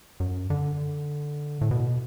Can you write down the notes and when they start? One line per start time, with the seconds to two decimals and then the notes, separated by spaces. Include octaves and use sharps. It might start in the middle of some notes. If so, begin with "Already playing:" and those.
0.20 F#2
0.50 D3
1.61 A2
1.71 B2